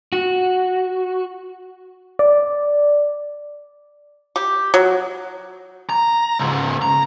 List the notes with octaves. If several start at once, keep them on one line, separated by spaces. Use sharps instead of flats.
F#4
D5
G4
F#3
A#5
C#2 G#2
A#5